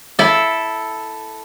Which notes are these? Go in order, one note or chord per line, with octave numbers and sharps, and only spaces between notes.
E4 A4